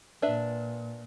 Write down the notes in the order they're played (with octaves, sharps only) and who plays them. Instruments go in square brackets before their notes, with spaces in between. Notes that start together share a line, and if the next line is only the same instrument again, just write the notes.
[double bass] A#2 [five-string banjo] D4 B4 E5